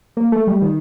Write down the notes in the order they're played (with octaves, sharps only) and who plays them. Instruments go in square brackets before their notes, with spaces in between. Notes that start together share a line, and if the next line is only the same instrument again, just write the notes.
[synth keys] A#3
A3
G3
D#3